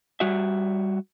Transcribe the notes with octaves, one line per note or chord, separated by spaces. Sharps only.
G3 F#4 E5